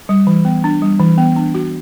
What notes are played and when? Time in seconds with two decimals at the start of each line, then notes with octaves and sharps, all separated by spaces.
0.09 G3
0.27 E3
0.45 B3
0.64 D4
0.82 G3
0.99 E3
1.18 B3
1.36 D4
1.54 F#4